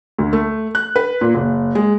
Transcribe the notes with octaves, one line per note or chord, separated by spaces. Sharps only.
D2
A3
F#6
B4
A#2
F#1
G#3